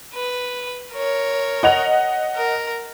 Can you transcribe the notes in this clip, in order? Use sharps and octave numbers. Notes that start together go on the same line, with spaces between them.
B4
A#4 C#5
D#5 F#5 F7
A#4